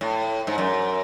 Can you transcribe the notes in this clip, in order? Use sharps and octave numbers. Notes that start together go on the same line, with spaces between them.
A2
G#2
F#2